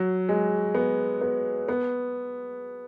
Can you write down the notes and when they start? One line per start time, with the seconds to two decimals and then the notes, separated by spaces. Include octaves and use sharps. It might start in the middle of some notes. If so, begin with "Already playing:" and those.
Already playing: F#3
0.29 G#3
0.75 B3
1.21 B3
1.68 B3